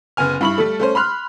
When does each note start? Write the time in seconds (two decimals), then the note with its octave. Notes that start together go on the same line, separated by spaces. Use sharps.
0.17 F#1 B3 G#5 F6
0.41 G2 E4 B5 C#6 F#7
0.58 G3 A3 A4
0.80 A3 C#4 C5
0.95 B5 C6 F6 F#6